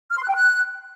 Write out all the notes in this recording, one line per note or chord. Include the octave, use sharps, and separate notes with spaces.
F6
C6
F#6
G5
F#6